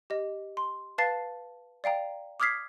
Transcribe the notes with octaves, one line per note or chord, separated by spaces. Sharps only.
G4 D#5
C6
B4 F5 A5 A6 C7
D5 F5 G5 A#5
D6 D#6 F6 G#6 B6 C7